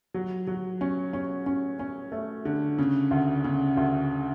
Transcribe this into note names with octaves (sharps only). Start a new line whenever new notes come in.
F#3
F#3
C#4
C#4
C#4
C#4
A3
D3
C#3
D2
C#3
D2